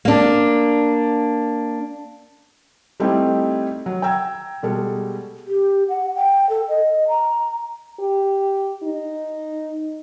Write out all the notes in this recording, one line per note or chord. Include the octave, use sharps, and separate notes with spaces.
A#3 D4
G3 A3 C4 D#4 E4 G4
F#3
G5 A#5 E6 G#6
B2 G3 G#3 A4
G4
F#5
G5
A4
D#5
A#5
G4
D#4